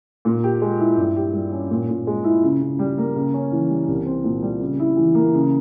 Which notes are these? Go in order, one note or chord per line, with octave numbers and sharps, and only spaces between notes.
A#2
G4
G#3
E4
G2
G4
G3
C#4
A#2
A#2
G#3
E4
C#3
C#3
G3
A#3
C#3
C#4
E3
G3
C2
C4
A#2
G3
C#3
E4
E3
A#3
C#3